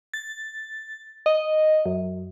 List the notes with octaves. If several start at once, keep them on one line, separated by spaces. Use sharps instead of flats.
A6
D#5
F#2